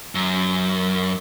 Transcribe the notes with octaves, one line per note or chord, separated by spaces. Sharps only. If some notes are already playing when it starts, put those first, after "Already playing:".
F#2